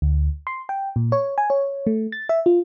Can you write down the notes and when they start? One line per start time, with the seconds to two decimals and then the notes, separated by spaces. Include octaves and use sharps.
0.02 D2
0.47 C6
0.69 G5
0.96 A#2
1.12 C#5
1.38 G#5
1.50 C#5
1.87 A3
2.12 A6
2.29 E5
2.46 F4